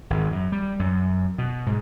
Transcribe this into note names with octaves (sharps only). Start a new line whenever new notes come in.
G#1
F#2
G3
F#2
B2
G#2